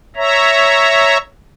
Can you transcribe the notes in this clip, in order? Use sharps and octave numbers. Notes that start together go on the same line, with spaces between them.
C#5 E5 A#5